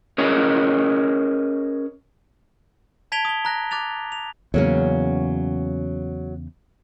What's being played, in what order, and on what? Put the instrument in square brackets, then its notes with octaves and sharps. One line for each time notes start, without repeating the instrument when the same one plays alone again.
[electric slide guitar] C#4 G#4 A#4 B4 C#5 D#5
[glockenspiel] A5 G#6 B6 D7 F7 G7
D#6 G7
A#5 F#6 A#6
D6 F#6 A6 F7
F7
[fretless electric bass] E2 C#3 [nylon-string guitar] F#3 A#3 C#4